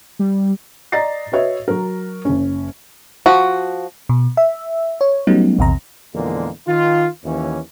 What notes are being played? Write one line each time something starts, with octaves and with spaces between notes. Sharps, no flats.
G3
D5 D#5 A#5 A6 A#6 C7
F#4 B4 C#5 D#5 E5
F#3 A#4
F#1 C#4
F3 F#4
B2
E5
C#5
F#3 G3 A3 B3 C#4 D#4
A#1 E2 C3 A#5
E2 A#2 D3 F3 G#3 A#3
D#3 F4
D#2 E3 C#4